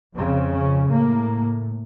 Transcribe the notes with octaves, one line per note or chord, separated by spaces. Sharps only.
F2 C#3 C4
C#4
A2 A#3